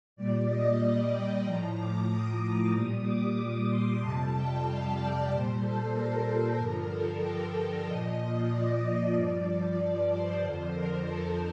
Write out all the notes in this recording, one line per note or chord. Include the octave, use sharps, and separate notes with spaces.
A#2 G3 D5
D#5
G5
A2 F3 A#5
D6
D#6
A#2 G3
D6
C6
F2 C3 G3 A5
G5
F5
D5
A#2 G3 C5
A4
A#4
G2 D3 F3 A#4
A4
G5
A#2 F3 D#5
D5
D5
G2 F3
D5
C5
F2 D3 F3
A#4
A4